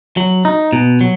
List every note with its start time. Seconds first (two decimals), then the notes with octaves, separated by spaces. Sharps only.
0.17 F#3
0.45 D#4
0.73 B2
1.01 F#3